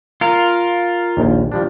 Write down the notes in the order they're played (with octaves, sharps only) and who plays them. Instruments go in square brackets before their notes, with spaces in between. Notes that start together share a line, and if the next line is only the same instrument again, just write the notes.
[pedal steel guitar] F4 A#4
[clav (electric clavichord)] A#1 D#2
F3 G3 D4